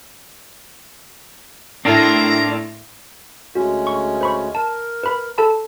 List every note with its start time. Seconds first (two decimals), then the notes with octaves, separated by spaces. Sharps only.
1.85 A2 A3 A#3 C4 D4 E4 F4 A#5
3.55 D2 G#3 C#4 F#4
3.87 C#6
4.21 C5 B5 C#6
4.55 A#4 A5
5.03 B4 B5
5.38 A4 A5 B5